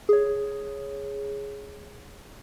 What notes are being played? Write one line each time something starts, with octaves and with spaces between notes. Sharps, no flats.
G#4 C#5